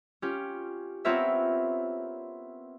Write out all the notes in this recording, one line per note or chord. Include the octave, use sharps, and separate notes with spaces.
C#4 F4 G4
B3 C4 F4 A#4 C#5 E5